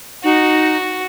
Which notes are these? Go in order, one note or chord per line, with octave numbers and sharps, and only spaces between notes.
D#4 F#4